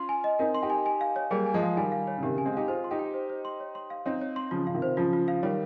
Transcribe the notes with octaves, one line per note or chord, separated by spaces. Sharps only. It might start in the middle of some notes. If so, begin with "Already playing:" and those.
Already playing: C#4 F4 C6
G#5
D#5
C4 D#4 A#4
C6
D#4 G4
G#5
G#5
F5
C#5
G3 A#3 G#4
G#5
F3 G#3
F5
D#3 G3 G#5
F5
C#5
C#3
C3 D#3 G4
C#3 G#5
G#3 C4
D#4 G4 F5
F4 G#4 C5
C6
D#4 G4
G5
C5
C5
C6
C#5
C6
F5
C4 D#4 C#5
C#5
C6
C#3 F3 F4
C#3 F5
C3 D#3
C5
C#3 F3 F4
F4
F5
D#3 G3 C#5